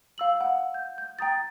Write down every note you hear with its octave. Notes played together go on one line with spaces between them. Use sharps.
F5 E6 F#7
F#5
G6
G6
G5 A#5 D#6 A6